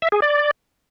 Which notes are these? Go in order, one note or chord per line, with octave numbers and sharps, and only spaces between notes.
E5
G#4
D5